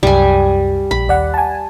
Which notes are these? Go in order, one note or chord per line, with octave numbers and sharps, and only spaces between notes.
C2 F#2 G3 G#5
A#1 B5
D#2 D5 F#5
G#5 A5